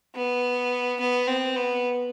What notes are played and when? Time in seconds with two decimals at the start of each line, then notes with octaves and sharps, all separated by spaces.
0.15 B3
1.00 B3
1.27 C4
1.56 B3